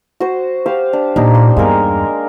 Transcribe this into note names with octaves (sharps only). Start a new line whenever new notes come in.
F#4 C5
G4 C5 F5
D4
A#2 D4 D#4 G4
C6
E2 G2 G#3 A#3 A#4